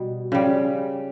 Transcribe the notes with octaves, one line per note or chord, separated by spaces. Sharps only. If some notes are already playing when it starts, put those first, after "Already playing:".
Already playing: B2 G3
C#3 G3